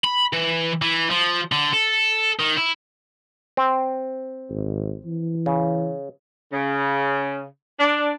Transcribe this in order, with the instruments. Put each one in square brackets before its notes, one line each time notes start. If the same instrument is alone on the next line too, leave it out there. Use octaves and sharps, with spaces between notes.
[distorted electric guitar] B5
E3
E3
F3
D3
A4
D#3
E4
[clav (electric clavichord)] C4
[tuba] G#1
E3
[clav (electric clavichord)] C#3
[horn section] C#3
D4